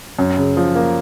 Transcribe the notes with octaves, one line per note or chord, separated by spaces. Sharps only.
F#2
C#3
F3
A#3